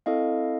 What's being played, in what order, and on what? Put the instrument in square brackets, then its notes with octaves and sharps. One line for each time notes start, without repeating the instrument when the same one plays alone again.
[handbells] C4 E4 A4 D#5 F5